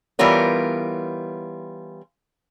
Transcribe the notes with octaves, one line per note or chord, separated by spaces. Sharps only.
E3 G3 B3 F4 A#4 C#5